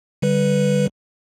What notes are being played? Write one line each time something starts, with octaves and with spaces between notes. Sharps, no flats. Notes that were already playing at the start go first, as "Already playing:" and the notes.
D3 G3 B4